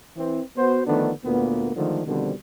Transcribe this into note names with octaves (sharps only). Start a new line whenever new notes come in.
E3 C4
B3 F#4 C5
D3 D#3 F3 A3 B3 D4
D2 A#2 A#3 B3
D3 D#3 F3 G#3 A3 D4
B2 D3 D#3 F3 G3 C4